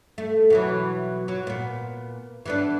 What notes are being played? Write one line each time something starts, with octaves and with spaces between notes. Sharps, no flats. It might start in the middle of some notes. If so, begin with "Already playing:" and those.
A3
B2 E3 F#3
F#3
A#2 B3
E3 B3 D4